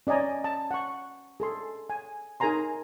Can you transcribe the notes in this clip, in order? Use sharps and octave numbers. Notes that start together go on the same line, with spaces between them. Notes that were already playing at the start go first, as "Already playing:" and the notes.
C#4 D5 D#5 G#5 A#5
A5
F#5 C#6
G#4 A4 C6
G#5
D#4 G#4 A#4 G#5 A#5 C6